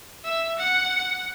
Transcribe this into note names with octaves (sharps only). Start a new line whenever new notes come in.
E5
F#5